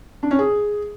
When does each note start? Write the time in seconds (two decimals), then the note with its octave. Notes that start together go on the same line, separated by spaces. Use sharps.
0.23 D4
0.31 C#4
0.39 G#4